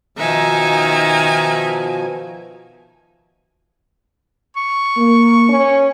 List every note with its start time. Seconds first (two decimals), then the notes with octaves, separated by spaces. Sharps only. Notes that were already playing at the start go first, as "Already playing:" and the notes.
0.18 B2 D#3 F3 D#4 E5 G#5
4.56 C#6
4.98 A#3
5.49 C#4